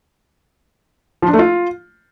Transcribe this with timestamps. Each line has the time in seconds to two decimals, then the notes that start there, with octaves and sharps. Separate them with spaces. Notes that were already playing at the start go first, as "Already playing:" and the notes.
1.22 F3
1.28 D4
1.33 A3
1.39 F4